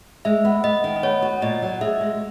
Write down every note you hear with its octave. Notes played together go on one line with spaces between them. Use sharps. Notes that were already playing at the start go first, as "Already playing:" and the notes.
G#3 E5
B3
B3 D#5
D#3
D#5
B3 C#5
F#4
A#2 D#5
F#3
G#4 E5
G#3